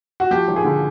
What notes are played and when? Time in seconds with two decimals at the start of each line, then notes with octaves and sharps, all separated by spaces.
0.20 F#4
0.31 F3 G4
0.48 G#1
0.56 G#4
0.64 D3